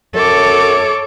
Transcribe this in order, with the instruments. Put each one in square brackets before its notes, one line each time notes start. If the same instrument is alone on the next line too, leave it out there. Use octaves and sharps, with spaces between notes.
[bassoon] F#2 [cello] A4 [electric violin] C#5 D6